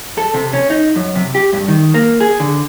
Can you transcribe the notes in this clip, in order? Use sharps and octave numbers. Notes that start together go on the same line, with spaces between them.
A4
C3
C#4
D#4
F#2
C3
G4
G2
D#3
A#3
G#4
D3